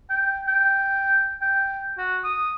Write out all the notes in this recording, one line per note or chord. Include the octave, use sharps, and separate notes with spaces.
G5
G5
G5
F#4
D#6